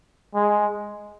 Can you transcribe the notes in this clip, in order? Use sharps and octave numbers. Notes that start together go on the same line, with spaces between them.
G#3